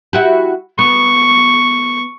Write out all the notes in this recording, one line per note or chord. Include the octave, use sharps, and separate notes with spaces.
E4 F#4 G4
B3 C#6